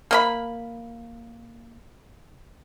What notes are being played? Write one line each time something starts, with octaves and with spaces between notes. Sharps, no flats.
A#3 D#5 B5